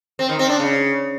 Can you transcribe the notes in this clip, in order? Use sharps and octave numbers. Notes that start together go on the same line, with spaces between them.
C4
D#3
C4
D4
C#3